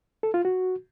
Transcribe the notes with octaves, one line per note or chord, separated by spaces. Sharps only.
A4
F4
F#4